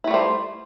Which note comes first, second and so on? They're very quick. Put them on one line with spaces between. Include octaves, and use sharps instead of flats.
E4 A3 G3 C5